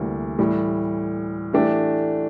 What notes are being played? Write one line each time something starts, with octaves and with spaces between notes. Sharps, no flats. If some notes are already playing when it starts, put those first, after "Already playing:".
Already playing: D2 C3 E3 G3 A#3
A2 E3 G3
E3 A3 D4 G4